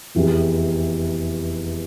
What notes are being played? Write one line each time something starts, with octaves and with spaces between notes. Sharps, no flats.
F1 E2 C3 E3